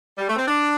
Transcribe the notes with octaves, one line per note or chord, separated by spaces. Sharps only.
G3
A3
C4
D4